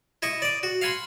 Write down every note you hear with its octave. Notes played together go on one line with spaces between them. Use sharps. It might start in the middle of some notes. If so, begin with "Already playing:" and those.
E4 D#5 C#6
D5 D#6
F#4
F5 F#5 G#5 B5 C6